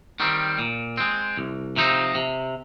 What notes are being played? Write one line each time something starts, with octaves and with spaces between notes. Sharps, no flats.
D#3 G3 C4
A#2
G#3 C4
C2
C3 F3 C4 D#4
C3